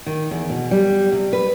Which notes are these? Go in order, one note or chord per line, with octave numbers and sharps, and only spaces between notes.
D#3
E2
B2
G3
C3
B4